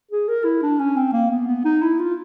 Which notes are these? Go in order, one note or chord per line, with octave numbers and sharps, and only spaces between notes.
G#4
A#4
E4
D4
C#4
C4
A#3
B3
B3
D#4
E4
F4